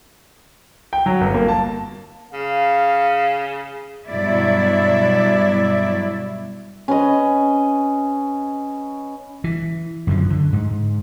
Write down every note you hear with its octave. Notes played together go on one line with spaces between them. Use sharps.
G5
F#3
G1
A#3
A5
C#3 F5
G2 B2 F#3 E4 D5 E5
C#4 B4 D#5
E3
F#2 D3 F3
D3
G#2